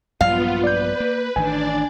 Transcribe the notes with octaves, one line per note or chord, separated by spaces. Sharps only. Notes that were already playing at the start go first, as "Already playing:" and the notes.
A#1 G2 F#3 B3 F4 F5
B4 D5 G6
A#3
A1 D#3 D4 D5 G#5